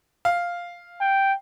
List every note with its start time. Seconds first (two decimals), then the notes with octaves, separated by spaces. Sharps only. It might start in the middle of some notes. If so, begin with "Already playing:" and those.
0.25 F5
1.01 G5